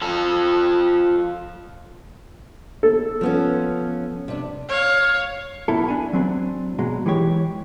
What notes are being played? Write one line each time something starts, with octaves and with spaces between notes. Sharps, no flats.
F3 A4
A4
F3 B3 C#4
C3 D4
C#5 F5
B1 B2 E4 A4
D4 G#5 B5
F#3 C4 D4
B2 F#3 G#3
E3 G#3 G4 C#5